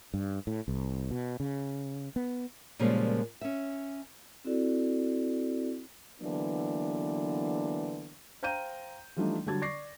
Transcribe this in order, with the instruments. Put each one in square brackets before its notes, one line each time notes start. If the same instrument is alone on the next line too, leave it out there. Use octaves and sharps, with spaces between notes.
[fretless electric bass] G2
A2
C2
B2
C#3
B3
[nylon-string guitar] A#2 C#3 F3 G3 G#3 A#3
C#4 E5
[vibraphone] C4 E4 F#4 A4 D5
[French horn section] D3 E3 F#3 A#3 B3 D4
[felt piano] C5 F5 G5 A#5 G6 D#7
E3 F3 G3 A3 D4 D#4
D3 F#3 G3 A5 G#6 A6
D5 C#6 D6 A#6 C7